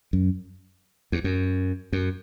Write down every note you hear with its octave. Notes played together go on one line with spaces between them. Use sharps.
F#2
E2
F#2
F#2